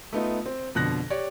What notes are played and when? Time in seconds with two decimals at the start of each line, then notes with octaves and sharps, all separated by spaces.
0.13 A3 B3 D#4 F4
0.46 C4
0.75 F2 B2 D3 F#6 A#6
1.10 G4 C#5 D5